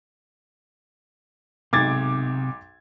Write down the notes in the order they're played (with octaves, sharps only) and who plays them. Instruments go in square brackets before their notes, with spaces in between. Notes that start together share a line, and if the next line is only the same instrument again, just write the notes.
[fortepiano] B1 G#2 [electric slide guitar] C3 [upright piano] D6 G#6 A6